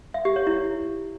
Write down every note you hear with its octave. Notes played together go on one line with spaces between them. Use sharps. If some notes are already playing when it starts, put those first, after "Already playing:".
E5
G4
C#5
E4